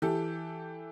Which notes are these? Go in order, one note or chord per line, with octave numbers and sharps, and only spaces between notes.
E3 G4 A4